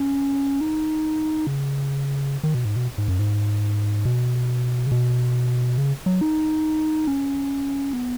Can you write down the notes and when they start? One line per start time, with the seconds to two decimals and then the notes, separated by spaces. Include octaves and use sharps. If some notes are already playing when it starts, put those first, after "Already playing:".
Already playing: C#4
0.61 D#4
1.47 C#3
2.43 D#3
2.54 B2
2.65 G#2
2.76 B2
2.98 G#2
3.08 F#2
3.19 G#2
4.05 B2
4.87 C#3
4.92 B2
5.78 C#3
6.06 F#3
6.21 D#4
7.07 C#4
7.93 B3